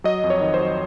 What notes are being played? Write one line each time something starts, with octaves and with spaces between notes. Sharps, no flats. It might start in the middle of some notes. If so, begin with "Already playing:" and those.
F#3 D#5
F2
C#5
D#3
C5
F#3